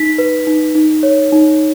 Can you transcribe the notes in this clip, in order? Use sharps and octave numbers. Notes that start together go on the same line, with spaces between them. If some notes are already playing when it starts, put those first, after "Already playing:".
Already playing: D#4 B6
B4
D#4
D#4
C#5
D#4